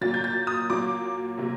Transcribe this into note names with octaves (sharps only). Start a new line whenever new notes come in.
A#2 F#3 A#3 A6
G6
A6
D#6
A#2 F#3 A#3 D6
C3 F#3 A#3